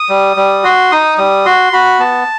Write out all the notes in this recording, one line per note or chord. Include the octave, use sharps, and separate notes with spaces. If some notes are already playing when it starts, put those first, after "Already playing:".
Already playing: D#6
G3
G3
F#4 C6
D#4 D#6
G3 D#6
F#4 C6
F#4 B5
B3 A5